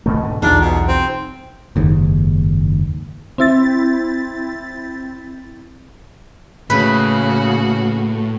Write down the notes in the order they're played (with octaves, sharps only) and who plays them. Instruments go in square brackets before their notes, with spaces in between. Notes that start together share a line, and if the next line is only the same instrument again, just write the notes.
[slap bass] G#2 B2 A3
G#2 D3
[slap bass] B1 E2 [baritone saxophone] D4 [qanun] D#4 F4 G#4
[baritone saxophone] B2
C4
[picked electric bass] F#1 D#2 G#2
[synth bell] C4 E4 A6
[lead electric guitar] A2 [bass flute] C#3 [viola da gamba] A#3 F#4 [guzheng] B4